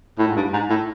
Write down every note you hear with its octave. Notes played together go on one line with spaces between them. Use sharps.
A2
G#2
G2
G#2
A2